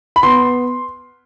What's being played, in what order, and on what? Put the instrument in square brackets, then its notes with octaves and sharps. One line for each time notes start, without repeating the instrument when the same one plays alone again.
[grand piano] B5
B3 C6